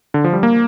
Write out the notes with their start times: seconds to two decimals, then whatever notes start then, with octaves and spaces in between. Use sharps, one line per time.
0.14 D3
0.24 F3
0.33 G3
0.43 A#3